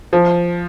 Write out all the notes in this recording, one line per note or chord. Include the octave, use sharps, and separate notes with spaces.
F3